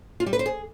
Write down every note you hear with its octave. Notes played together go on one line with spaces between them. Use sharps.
F4
G3
B4
C5
G#4